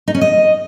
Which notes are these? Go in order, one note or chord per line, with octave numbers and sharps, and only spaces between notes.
D#4
C#4
D#5